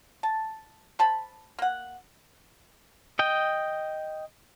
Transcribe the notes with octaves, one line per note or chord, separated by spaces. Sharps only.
A5
C5 A5 B5
A#3 F#5
D#5 G5